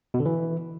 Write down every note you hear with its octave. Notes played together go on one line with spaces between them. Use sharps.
B2
D3
E3